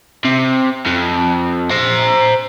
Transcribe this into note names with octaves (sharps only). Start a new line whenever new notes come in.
C3
F2
C5 A#5